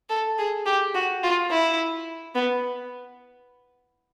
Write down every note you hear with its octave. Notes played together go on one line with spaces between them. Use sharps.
A4
G#4
G4
F#4
F4
E4
B3